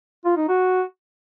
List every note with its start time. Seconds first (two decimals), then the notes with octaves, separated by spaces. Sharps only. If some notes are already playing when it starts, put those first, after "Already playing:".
0.25 F4
0.37 D#4
0.48 F#4